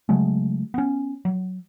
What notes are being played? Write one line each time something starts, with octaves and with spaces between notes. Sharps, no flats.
C#3 F#3 G#3 A3
B3 C#4
F#3